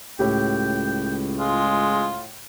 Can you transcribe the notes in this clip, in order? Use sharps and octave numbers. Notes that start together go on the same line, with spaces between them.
C#2 A2 G4 G5
G#3 F4